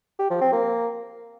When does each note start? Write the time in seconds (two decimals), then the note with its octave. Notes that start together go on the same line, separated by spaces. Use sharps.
0.19 G4
0.30 F3
0.41 C4
0.52 A#3